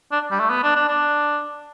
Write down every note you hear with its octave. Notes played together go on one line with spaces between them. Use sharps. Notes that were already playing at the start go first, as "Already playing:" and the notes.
D4
G3
A3
B3
D4
D4
D4